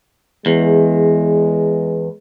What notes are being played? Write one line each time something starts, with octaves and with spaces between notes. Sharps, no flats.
E2 G#3